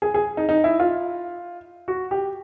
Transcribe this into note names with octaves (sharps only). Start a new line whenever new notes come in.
G#4
G#4
D#4
D#4
E4
F4
F#4
G4